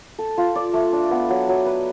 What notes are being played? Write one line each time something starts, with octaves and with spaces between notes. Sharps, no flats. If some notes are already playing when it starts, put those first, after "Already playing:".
A4
F4
D5
A3
D4
B3
F#3
F#3
B4